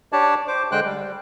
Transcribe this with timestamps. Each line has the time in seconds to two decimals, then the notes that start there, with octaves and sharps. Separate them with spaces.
0.13 D4 G4 C#5 D5 A5
0.48 C5 D6
0.72 D3 G#3 C5 G5 F#6
0.85 G3